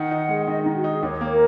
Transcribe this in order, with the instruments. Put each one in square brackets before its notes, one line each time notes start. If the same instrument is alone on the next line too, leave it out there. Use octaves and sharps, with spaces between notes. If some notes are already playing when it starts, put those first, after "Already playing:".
Already playing: [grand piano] D#3 D#4 [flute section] F#5
[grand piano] D#4
G#3
[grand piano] D#3 [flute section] D#5
[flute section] D#4
[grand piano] D#3
[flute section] F#4
[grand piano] D#4 [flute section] G#4
[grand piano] D#2 [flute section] C#5
[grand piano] A#3
[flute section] A#4